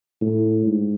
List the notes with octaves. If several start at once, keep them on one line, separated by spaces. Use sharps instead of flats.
A2
G#2